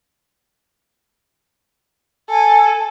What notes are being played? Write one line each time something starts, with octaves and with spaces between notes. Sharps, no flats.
A4 G#5